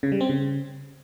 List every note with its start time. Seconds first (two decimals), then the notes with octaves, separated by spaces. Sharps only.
0.03 C#3
0.12 G3
0.21 C4
0.29 C#3